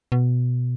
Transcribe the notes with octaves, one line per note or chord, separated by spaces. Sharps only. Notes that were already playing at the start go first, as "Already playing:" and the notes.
B2